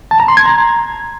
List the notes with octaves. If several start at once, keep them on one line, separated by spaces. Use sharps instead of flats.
A5
A#5
C6
G#6
A#5